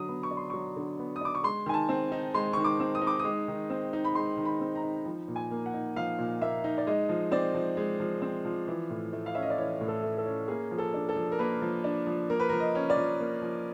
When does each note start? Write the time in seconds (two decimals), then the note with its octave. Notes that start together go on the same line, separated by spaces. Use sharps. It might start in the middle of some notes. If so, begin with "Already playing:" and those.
Already playing: D3 F#3 D#6
0.08 B3
0.23 C#6
0.31 D4
0.37 C6
0.50 F#3 C#6
0.76 D3
0.99 B3
1.16 D#6
1.21 D4 D6
1.35 C#6
1.43 G#3 C6
1.66 D#3 G#5
1.74 A5
1.89 C4
2.12 D#4
2.34 G#3 C6
2.53 D#3 C#6
2.64 D6
2.80 C4
2.95 D#6
3.02 D#4
3.07 D6
3.19 G#3 D#6
3.48 D#3
3.70 C4
3.93 D#4
4.05 B5
4.15 G#3 C6
4.37 D#3
4.45 B5
4.61 C4
4.75 A#5
4.83 D#4
5.05 F3
5.28 A#2
5.36 G#5
5.51 A#3
5.66 F#5
5.74 D#4
5.96 F3 F5
6.18 A#2
6.42 A#3 E5
6.64 D#4
6.78 D5
6.87 G#3 D#5
7.09 F3
7.31 C4 D5
7.54 F3
7.77 G#3
8.00 F3
8.22 C4
8.45 F3
8.68 E3
8.90 A2
9.13 A3
9.26 F5
9.35 C#4 E5
9.42 D#5
9.50 D5
9.58 E3 C#5
9.81 A2
9.88 A4
10.03 A3
10.18 A4
10.26 C#4
10.48 A#3 G#4
10.71 F3
10.78 A4
10.94 D4
11.09 A4
11.16 F3
11.32 A#4
11.39 A#3 B4
11.62 F3
11.84 D4
12.07 F3
12.30 A#3 A#4
12.40 B4
12.49 F3 A#4
12.60 D#5
12.75 C#4
12.90 D5
12.97 F3
13.20 A#3
13.42 F3